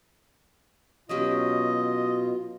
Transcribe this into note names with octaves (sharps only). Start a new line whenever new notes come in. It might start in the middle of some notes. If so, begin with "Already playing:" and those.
B2 F#3 C#4 F4 G4 D#5